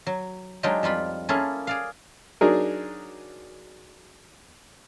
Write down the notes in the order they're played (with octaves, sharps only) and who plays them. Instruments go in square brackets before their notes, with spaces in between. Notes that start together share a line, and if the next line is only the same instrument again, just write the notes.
[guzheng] F#3
F#3 G#3 D4 D#4 F4 G4
F2 G3 F4 B5
A#3 C#4 E4 F4 G#4 A4
G#4 D5 F5
[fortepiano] F#3 D4 D#4 G#4 A#4